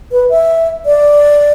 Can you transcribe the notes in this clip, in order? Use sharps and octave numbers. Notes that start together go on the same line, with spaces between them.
B4
E5
D5